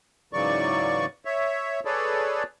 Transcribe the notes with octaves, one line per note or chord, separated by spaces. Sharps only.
G#2 C#3 E3 F#3 D5 C#6
C#5 E5
G#4 A4 B4 C#5 D5